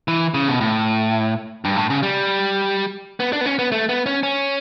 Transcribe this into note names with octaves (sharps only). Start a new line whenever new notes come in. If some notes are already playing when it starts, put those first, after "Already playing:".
E3
C#3
B2
A2
G2
A2
C#3
G3
B3
D4
B3
C#4
B3
A3
B3
C#4
C#4